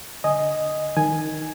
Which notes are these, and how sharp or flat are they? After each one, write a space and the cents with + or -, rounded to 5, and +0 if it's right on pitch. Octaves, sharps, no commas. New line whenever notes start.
D3 -20 D#5 +0 G#5 +0
D#3 +0 G#5 +0